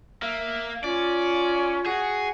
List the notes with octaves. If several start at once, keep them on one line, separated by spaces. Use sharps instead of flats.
A#3 E5
C#4 F4 D5
F#4 G#4